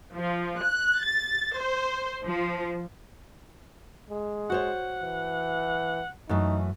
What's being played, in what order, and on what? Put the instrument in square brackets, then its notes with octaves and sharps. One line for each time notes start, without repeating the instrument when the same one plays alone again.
[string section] F3
F#6
A6
C5
F3
[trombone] G#3
[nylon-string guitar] F#4 C5 C#5 [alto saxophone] F#5
[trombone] E3
[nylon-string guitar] F#2 E3 A3 [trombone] D#4